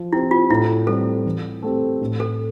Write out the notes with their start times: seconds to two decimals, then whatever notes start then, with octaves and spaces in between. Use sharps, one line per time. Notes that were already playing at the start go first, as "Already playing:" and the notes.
Already playing: F3
0.12 C4 E4 G4
0.31 F4
0.50 A2 E4
0.87 G3 C4 A4
1.26 E3
1.62 A3 C4 G4
2.01 A2
2.20 A4